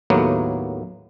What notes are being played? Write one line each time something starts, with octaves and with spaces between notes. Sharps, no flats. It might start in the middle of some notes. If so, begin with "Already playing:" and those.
D#2 A2 F#3 A#3 B3